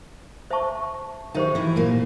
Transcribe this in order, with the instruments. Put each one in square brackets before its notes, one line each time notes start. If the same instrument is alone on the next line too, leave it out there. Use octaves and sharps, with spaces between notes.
[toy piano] C5 E5 A5 C#6
[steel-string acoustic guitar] D#3 D#4 [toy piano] G4 C5 E5
[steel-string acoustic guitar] E3 E4
A#2 A#3